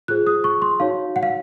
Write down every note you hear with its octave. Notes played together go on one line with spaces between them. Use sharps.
F4 G#4 C5 F#6
D#6
C#6
C6
D#4 F#4 C#5 F5
F#5
F5